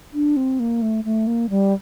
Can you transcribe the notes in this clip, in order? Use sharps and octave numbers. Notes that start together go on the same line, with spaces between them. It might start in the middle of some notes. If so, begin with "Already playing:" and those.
D4
C4
A#3
A3
A3
A#3
G3